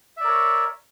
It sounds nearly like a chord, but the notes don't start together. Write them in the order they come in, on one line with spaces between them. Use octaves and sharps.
E5 D5 A#4 C#5